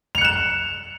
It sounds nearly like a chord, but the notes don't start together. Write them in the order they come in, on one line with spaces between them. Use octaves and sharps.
F7 C#7 F#6 E7